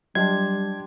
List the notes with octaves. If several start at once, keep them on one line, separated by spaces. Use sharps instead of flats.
F#3 G3 D4 G4 C6 G#6